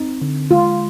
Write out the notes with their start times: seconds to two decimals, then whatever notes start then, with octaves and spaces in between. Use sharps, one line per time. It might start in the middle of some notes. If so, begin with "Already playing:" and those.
Already playing: C4 D#4
0.22 D3
0.51 G#3 F4